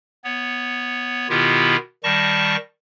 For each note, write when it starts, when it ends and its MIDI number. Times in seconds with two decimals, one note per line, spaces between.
0.24 1.28 59
0.24 1.28 73
1.29 1.76 47
1.29 1.76 51
1.29 1.76 59
1.29 1.76 64
1.29 1.76 65
1.29 1.76 67
2.04 2.56 51
2.04 2.56 55
2.04 2.56 81
2.04 2.56 85
2.04 2.56 94